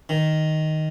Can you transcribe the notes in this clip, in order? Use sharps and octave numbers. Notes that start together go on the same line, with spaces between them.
D#3